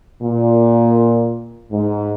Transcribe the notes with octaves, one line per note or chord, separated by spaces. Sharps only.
A#2
G#2